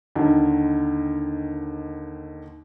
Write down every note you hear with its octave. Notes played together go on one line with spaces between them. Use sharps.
D#2 D3 D#3